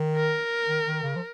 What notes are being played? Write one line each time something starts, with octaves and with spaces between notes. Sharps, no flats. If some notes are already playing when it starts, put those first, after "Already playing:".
Already playing: D#3
A#4
D#3
D#3
C#3
F3